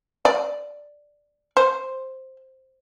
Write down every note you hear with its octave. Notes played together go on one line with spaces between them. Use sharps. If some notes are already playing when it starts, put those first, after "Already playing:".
D5
C5